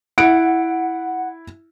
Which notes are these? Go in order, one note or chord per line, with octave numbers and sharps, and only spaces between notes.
E4 F#5 D7